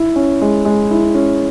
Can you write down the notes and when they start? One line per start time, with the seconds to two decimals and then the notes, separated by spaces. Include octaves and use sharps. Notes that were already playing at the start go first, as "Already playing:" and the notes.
Already playing: E4
0.16 C#4
0.41 G#3
0.65 G#3
0.91 E4
1.15 C#4